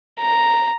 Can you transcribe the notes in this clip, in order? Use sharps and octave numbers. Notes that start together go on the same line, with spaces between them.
A#5